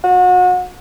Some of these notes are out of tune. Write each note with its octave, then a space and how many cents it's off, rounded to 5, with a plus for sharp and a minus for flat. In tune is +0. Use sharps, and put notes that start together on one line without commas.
F#4 -35